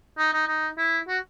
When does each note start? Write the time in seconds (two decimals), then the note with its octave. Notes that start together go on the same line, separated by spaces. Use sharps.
0.18 D#4
0.33 D#4
0.48 D#4
0.78 E4
1.08 F#4